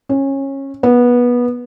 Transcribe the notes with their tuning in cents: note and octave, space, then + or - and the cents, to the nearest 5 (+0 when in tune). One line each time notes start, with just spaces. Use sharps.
C#4 -20
B3 -20